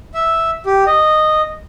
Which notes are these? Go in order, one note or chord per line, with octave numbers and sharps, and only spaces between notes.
E5
G4
D#5